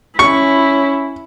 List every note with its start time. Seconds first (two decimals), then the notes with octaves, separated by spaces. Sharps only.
0.19 C#4 E4 C#6